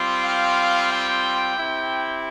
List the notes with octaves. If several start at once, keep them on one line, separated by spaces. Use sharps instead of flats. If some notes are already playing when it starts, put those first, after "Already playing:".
Already playing: G3 C4 F4
F5
G5
C4 E4 G4